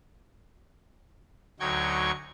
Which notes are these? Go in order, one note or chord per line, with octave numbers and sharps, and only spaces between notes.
D2 F#3 D#4 G5 C#6 G#6